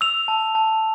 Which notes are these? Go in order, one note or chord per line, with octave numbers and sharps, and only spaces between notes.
E6 F7
A5
A5